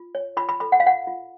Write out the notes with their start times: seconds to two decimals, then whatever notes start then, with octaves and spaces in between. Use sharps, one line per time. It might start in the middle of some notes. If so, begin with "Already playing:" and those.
Already playing: F4
0.15 C#5
0.37 F4 B5
0.49 B5
0.60 A4 B5
0.72 F#5
0.80 F5
0.84 F4 F#5
1.07 F4